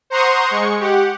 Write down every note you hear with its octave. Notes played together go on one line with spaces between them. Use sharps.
C5 F#5 A#5 C6 C#6 D#6
G#3 C#6
G4 F#5